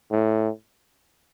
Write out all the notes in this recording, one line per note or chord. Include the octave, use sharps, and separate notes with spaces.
A2